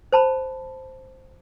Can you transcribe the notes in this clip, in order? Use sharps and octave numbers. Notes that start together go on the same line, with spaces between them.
C5 A5 B5